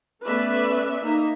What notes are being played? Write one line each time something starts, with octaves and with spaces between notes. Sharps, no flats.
A3 B3 C#4 B4 D5 E5
A#3 D#4 E5